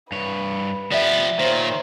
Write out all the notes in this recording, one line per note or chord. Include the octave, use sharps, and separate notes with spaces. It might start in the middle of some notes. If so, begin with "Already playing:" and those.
G2 B4 C#5
F3 B3 G4 D5 E5
A#2 D#3 C5 C#5